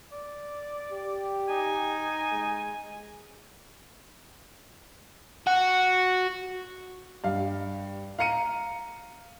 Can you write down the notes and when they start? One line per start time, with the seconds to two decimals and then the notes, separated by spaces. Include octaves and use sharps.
0.12 D5
0.92 G4
1.49 D#4 G#5
2.32 G#3
5.47 F#4
7.24 G2 F5
8.19 F5 A#5 C#7 D#7